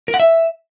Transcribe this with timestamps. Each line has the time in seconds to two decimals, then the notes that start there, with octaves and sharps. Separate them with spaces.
0.08 A#4
0.14 F#5
0.20 E5